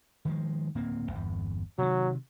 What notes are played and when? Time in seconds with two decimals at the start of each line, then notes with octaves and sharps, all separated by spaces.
0.25 D#3 F3 G#3
0.75 D1 A#3 C4
1.11 G1 E2
1.78 C3 D#3 F#3